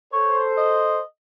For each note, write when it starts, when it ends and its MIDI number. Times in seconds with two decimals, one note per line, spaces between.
0.13 1.00 69
0.13 1.00 72
0.13 0.40 73
0.57 1.02 75